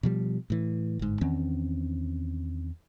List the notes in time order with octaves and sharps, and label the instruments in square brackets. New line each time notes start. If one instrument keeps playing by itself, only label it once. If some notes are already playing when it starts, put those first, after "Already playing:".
[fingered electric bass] B2 F3 G3
A2 E3
G1 G#2
E2 D#3 C4 C#4